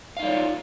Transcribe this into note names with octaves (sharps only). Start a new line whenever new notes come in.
D#4 F4 C#5 D5 F5